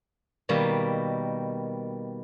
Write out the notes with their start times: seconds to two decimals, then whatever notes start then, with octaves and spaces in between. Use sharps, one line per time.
0.49 B2 D#3 G3 A#3